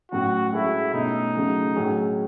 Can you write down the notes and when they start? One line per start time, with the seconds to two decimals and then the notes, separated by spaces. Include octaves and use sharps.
0.11 A2 F#3 C#4 F#4
0.53 G#3 C#4 E4 F#4 A4
0.94 B2 A3 C#4 D#4
1.35 C#3 F#3 A3 C#4
1.76 A2 F#3 C#4 G#4